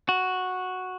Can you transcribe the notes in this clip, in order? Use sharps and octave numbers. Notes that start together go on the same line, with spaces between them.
F#4